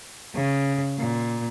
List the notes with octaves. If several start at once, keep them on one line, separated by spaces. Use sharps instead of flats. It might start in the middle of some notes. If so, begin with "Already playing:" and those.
C#3
A#2